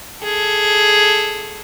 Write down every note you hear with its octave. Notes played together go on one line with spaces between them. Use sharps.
G#4 A4